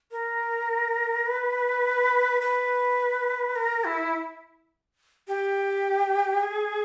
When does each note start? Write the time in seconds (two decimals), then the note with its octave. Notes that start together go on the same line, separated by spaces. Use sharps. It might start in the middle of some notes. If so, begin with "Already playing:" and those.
0.11 A#4
1.26 B4
2.41 B4
3.55 A#4
3.85 E4
5.28 G4
6.43 G#4